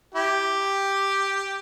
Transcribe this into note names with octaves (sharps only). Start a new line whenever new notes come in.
E4 G4